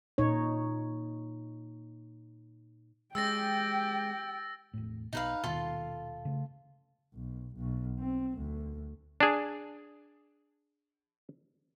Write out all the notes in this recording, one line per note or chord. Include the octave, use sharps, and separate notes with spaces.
A#2 D#4 C#5
G#3 C#4 G4 G5 E6 A6 A#6
E1 A2
B1 B2 D#4 B4 F5
D#1 D#2 B2 F4 A4 C6
C#3 A3 C#4
B1
B1
C4
D2
D4 G#4